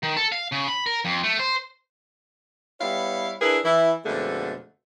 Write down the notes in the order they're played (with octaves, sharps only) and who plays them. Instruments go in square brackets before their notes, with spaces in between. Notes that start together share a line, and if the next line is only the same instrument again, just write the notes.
[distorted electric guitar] D#3
A4
F5
C#3
B5
A#4
F2
A3
C5
[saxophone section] G3 B3 E4 C#5 F5
D4 E4 G#4 A#4 B4
E3 E4
F2 B2 D3 G#3 A3